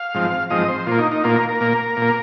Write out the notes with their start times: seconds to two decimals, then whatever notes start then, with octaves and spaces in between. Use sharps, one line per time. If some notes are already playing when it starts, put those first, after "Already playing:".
Already playing: F5
0.14 G#2 F3 C4
0.50 G#2 F3 C4 D#5
0.68 C5
0.87 A#2 A#3 F4
0.99 D#4
1.11 D#4
1.24 A#2 A#3 F4
1.36 A#4
1.49 A#4
1.61 A#2 A#3
1.97 A#2 A#3